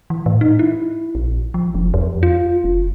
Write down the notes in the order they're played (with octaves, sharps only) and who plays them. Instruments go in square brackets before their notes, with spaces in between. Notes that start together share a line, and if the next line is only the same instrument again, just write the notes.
[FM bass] E3
A2
D#4
E4
A#1
F3
F1
F2
F4
F1